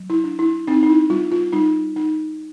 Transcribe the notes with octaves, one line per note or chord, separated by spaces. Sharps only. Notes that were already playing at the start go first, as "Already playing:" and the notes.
Already playing: F#3
E4
D4
E4
C4 D#4
D#4
E4
G3 F4
F4
G3 D#4
D#4